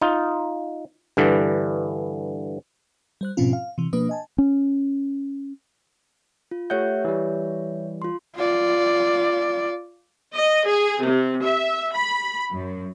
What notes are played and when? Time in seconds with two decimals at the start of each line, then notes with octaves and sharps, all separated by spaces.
0.01 D#4 F4
1.17 G2 D3 E3
3.21 G3 C5 F#6
3.37 G#2 B2 F3 C4 C#4 F4
3.53 F5
3.78 C3 E3
3.93 B2 F3 A#3 D4 B4 D#6
4.09 D#5 G#5 A5
4.38 C#4
6.51 F4
6.70 A3 G4 C#5 E5 F#5 G6
7.05 E3 G3
8.02 F4 C6
8.36 F4 D5
10.35 D#5
10.67 G#4
11.03 C3
11.44 E5
11.96 B5
12.50 F#2